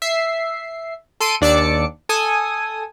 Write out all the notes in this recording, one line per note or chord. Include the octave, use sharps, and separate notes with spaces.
E5 C7
A4 C6 C7 D7 D#7
D#2 D4 D5 D6 E6 C#7
A4 G#5 D#6